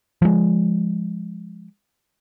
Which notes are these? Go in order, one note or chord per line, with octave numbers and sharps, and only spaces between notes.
F3 G#3